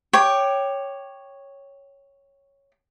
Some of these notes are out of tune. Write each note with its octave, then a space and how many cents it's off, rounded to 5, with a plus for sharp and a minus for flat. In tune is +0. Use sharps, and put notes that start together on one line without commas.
C#5 +0 G5 +0 D6 +15